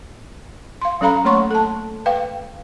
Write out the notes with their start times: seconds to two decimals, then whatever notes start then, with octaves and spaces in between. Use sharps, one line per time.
0.81 F5 C6
1.01 F#3 C#4 A4 F5 A#5 B5
1.25 A3 A#3 C#5 C6 C#6
1.51 A4 A5
2.06 B4 F5 G5